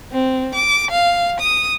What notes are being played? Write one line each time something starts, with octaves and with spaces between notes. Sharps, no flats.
C4
D6
F5
D#6